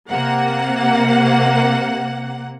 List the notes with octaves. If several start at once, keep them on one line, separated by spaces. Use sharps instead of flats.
C3 A#3 F#5